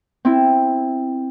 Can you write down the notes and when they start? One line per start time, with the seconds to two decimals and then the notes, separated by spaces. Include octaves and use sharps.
0.25 C4 E4